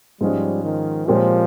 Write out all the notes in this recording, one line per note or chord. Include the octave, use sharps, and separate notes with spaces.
G#2 F3 G3 G#3 C#4 G#4
D#3
A#2 F3 G#3 C4 G4 C#5